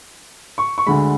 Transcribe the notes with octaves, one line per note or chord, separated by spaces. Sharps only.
C#6
C#6
D2 D3 G#3 B5